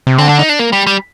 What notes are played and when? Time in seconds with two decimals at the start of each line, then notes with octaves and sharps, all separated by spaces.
0.07 C3
0.18 D3 C4
0.29 D4
0.39 D#4
0.49 D4
0.59 A#3
0.73 G3
0.87 G3